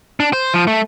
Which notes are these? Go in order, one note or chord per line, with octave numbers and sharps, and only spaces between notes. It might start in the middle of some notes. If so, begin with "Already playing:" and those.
D4
C5
F3
A3